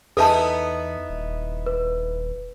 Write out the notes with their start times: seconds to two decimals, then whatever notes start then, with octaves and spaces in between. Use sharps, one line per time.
0.17 E2 B3 D#4 E4 A4 B4 E5 A5
1.09 D#1
1.66 B4